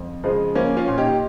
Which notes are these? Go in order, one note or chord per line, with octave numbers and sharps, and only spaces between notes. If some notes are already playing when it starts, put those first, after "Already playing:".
Already playing: F2
C#3 F3 G#3
F3 A#3 C#4
C#4 F4
A#2
D#4 G4